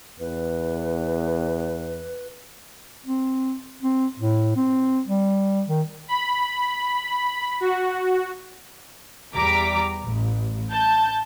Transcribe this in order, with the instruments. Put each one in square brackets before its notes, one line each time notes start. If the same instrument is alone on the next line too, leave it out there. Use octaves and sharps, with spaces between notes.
[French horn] E2 [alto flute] B4
[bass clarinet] C4
C4
A2
C4
G3
D#3
[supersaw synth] B5
F#4
[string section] E2 G3 A#5 D6 B6
A1
A5 G6